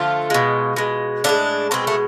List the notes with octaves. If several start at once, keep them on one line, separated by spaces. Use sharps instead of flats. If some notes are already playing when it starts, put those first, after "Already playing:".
Already playing: D3 F3 A3 F4
B2 G#3
B2 G#3
A2 F3 G#3 D4
B2 G#3 C4
A3